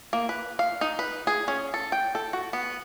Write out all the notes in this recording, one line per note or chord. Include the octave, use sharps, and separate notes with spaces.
A#3
B4
F5
D#4
B4
G#4
C#4
A4
G5
A4
F#4
B3